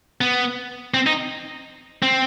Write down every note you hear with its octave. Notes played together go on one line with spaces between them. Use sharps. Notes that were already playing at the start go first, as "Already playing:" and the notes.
B3
C4
D#4
C4